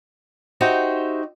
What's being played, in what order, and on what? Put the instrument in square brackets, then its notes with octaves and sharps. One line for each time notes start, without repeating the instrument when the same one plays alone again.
[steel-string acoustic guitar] D#4 F#4 G4 C5 E5